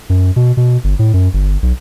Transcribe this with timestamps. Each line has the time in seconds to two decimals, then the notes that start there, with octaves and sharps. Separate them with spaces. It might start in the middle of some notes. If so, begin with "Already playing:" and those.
0.10 F#2
0.36 B2
0.57 B2
0.84 G1
0.99 A2
1.14 F#2
1.34 G1
1.62 B1